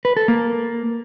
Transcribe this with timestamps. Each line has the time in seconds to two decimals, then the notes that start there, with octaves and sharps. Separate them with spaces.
0.05 B4
0.17 A4
0.28 A#3